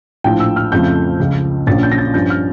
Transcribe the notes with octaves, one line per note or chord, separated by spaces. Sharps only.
A#1 A2 F3 G5
E6
F6
F2 C#3 F3 A3 G6
C#2 C#3 F3
A#1 A#2 F3 C#4 A6
G6
A#6
A6
G2 F3 C#4 G6
F6